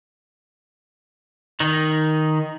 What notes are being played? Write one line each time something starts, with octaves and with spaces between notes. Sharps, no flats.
D#3 D#4